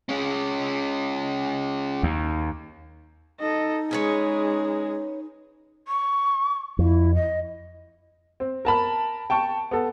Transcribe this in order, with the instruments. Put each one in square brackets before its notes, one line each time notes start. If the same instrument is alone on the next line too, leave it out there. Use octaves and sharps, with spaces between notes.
[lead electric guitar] G#3 C#4
[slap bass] D#2
[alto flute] D#4 [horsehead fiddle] A4 D#5
[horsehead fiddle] G#3 G#4 [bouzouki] C#4 B4 C#5
[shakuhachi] C#6
[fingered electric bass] F2 [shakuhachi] E4
[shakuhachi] D#5
[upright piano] C4
A#4 A5 B5
G5 A5 C#6
B3 A4